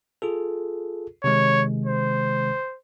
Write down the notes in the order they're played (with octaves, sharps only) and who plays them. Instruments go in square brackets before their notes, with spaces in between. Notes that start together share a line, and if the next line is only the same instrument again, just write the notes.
[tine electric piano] F4 G#4 A4
[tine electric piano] C3 D#3 G#3 [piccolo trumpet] C#5
[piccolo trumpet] C5